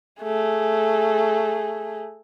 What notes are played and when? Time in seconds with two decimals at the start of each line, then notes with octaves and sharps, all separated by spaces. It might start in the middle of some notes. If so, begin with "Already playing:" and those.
0.21 A3 G#4